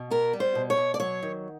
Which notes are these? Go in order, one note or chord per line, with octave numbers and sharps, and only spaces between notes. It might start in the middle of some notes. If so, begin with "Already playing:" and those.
Already playing: B2
B3 A#4
G3
C5
B2
C#5
B2
D5
F#3 C#5
D#3